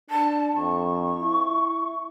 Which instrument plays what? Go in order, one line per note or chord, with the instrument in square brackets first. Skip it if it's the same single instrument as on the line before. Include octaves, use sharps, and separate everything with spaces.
[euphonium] D4 [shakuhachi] A5
[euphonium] F2 [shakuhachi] C#6
[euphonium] E4